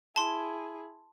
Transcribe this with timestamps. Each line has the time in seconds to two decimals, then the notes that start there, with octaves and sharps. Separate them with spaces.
0.16 E4 G#4 A5 C6